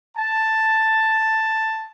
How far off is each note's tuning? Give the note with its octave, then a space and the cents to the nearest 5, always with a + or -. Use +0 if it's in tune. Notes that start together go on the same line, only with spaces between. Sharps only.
A5 +5